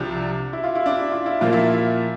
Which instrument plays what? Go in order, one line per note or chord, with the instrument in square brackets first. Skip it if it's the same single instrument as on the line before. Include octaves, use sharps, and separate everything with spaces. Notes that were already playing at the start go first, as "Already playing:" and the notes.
Already playing: [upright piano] C2 C3 F3 C4 [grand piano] D4
[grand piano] E4
F4
E4
D4
E4
F4
E4
[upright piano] A#2 F3 A#3 [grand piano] F4
[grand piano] E4
F4
E4